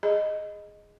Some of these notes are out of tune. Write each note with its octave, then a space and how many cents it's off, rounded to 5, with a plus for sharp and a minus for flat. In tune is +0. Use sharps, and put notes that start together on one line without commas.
G#4 +0 D#5 +0